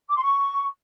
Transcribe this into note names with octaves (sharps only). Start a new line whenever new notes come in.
D6
C6
C#6